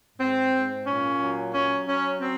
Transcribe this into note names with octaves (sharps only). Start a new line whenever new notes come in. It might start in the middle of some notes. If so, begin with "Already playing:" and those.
G#2 C4
G#2
A#2 C#4
F#3
F#3 C#4
F#3 C#4
F#3 C4